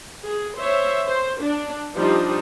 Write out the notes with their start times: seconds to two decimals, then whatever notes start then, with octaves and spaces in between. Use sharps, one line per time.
0.23 G#4
0.58 C5 C#5 E5
1.08 C5
1.43 D4
1.95 F3 G3 D4 D#4